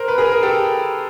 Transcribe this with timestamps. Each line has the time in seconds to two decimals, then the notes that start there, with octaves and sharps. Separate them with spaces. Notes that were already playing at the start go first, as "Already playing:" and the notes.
Already playing: A#4 C5
0.08 B4
0.18 G#4 A#4
0.32 A#4
0.43 G4 A4